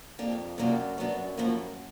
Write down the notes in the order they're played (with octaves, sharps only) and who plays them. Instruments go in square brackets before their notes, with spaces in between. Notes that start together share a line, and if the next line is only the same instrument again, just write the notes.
[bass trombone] F2 [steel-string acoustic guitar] A#3 D4 G4
[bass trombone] F#2 [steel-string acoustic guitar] C3 F3 A#3 D4 G4
[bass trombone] F#2 [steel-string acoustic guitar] F#3 B3 D4
[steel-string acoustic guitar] A2 F3 A#3